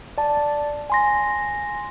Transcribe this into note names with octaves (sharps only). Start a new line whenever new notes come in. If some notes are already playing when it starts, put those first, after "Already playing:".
D5 A5
G#5 C6 A#6